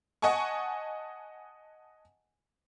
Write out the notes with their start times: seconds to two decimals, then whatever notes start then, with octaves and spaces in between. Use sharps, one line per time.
0.22 D#5 F#5 G#5 A5 C#6